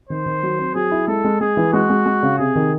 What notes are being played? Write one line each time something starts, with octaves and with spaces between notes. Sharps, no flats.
D#3 C5
D#3
F#3
C4
F#3 G#4
E4
G#3 A4
G#3
G#3 G#4
E3
G#3 F#4
G#3
G#3
C#3
C3 G#4
D#3